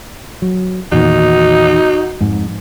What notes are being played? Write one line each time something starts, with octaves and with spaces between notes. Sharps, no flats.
F#3
E2 A#2 D#3 D#4 F#4
F2 G#2